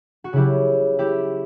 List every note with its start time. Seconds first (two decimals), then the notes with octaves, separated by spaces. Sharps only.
0.24 F#4
0.33 C#3 F#3 E4 G4
0.99 E4 G4